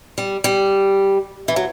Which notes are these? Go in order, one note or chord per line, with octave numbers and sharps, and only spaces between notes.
G3
G3
E3
F#3